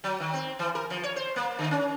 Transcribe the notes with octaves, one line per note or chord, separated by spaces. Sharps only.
F#3
D#3
C4
E3
A#4
F3
C#5
C5
A#3
D3
C#4